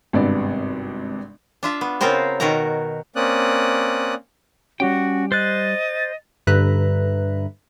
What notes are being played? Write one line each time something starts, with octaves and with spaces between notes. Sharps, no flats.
G#1 G2 C3 B3 D5
D4 F4 E5
B3
C#3 B3 C4 F4 A#4 C5
B2 D#3 F#4 A#4 A#5
A#3 C4 C#4 D5 D#6 F#6
G3 C#4 F#4 G4 G5
C5 D#5 F#6 A6
G2 D3 B4 E5 A#5 F#6